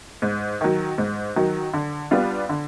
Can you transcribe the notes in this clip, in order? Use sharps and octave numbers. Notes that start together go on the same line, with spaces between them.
G#2
D#3 F#3
G#2
D#3 F#3
D3
G3 B3 D4 F4
D3